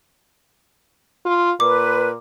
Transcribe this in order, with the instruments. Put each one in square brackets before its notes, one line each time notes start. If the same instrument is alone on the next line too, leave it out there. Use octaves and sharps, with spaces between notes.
[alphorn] F4
[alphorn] A#2 [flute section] B4 [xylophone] D6